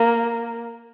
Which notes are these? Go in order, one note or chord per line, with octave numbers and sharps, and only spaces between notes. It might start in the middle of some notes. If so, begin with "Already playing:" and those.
Already playing: A#3